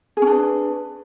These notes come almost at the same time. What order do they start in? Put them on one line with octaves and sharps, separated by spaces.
G#4 C#4 D4 B4